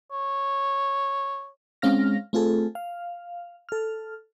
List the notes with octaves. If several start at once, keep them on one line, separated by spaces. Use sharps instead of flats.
C#5
G#3 C4 C#4 F5 F6 A#6
A3 C4 F4 G#4 A4
F5
A4 F6